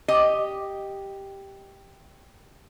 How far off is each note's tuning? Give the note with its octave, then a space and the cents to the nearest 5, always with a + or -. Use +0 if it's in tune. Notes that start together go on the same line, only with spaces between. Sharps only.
G4 +0 D#5 +0